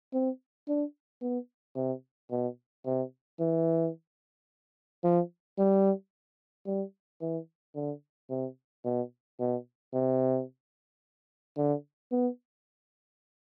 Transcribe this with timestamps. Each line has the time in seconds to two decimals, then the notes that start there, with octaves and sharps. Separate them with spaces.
0.13 C4
0.68 D4
1.22 B3
1.76 C3
2.31 B2
2.86 C3
3.40 E3
5.04 F3
5.58 G3
6.67 G3
7.22 E3
7.75 D3
8.30 C3
8.85 B2
9.40 B2
9.93 C3
11.57 D3
12.12 B3